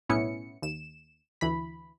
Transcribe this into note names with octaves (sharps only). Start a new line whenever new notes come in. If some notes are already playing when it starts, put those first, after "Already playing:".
B1 A2 B3 C#4 E4 C#7
D#2 E7
D2 E3 B5